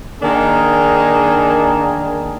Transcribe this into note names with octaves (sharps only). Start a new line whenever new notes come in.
D#3 A#3 D4 D#4 G#4 A#4